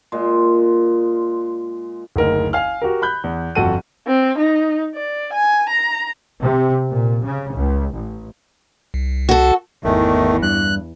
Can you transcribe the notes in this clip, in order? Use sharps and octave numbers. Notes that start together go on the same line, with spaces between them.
A#2 G#3
F#1 D2 D#4 A#4
F5 G#5 F6
F#4 G4 A#4
B5 F#6 G6
E2
G1 F2 F#4 A4 F#5 D#7
C4
D#4
D5
G#5
A#5
C3
A#2
C#3
C#2
A1
C2
F#4 A4
G#1 E2 D#3 E3 A3
G2 F#6